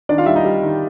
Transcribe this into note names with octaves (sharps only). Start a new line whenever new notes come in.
D#3 D4 D5
F4 F5
G3 E4 E5
D#4 D#5
G3
D#3